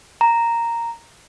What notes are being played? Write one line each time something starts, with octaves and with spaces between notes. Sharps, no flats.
A#5